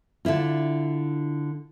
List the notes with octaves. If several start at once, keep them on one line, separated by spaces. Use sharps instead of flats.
D3 D4 E4 F4